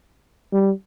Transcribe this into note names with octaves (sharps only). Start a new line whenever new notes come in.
G3